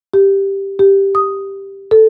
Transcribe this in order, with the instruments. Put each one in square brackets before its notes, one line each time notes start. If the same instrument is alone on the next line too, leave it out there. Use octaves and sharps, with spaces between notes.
[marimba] G4
G4
D#6
A4